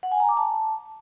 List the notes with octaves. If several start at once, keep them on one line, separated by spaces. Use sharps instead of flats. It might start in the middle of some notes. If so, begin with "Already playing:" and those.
F#5
G#5
A#5
D6
A5